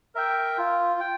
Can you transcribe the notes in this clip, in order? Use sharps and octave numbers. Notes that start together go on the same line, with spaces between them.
A#4 E5 G5
F4
G5